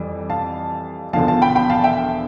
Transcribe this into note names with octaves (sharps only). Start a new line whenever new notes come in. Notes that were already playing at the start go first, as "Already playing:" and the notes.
Already playing: F2 E3 G3
F5 A5
E1 E2 D3 F3 F5 A5
F5 A5
G5 B5
G5 B5
F5 A5
E5 G5